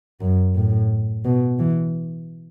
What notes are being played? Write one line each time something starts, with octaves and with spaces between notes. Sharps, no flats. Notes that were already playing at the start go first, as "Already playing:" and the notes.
F#2
A2
B2
E3